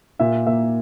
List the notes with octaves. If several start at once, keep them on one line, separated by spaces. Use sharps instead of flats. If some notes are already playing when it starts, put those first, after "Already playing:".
A#2 E5
A#3 E5